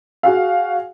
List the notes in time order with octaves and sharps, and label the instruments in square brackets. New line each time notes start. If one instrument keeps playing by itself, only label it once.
[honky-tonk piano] F#4 G#4 F5